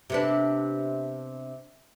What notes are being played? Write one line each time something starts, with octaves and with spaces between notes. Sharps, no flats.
C3 B3 D4